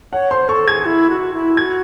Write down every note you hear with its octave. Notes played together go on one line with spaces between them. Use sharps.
C#5 F#5
C5 C6
A4 C#6
G#4 G#6
E4
F#4
E4
F#4 G#6